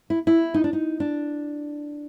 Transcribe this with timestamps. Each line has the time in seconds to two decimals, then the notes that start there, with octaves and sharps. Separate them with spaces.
0.10 E4
0.27 E4
0.54 D#4
0.64 D4
0.73 D#4
1.00 D4